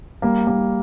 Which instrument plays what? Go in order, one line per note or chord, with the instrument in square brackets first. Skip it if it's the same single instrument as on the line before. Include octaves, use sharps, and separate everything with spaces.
[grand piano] G3 [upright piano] A#3
[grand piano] G3 [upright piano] A#3